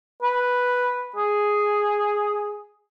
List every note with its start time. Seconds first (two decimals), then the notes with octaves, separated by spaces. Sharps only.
0.23 B4
1.16 G#4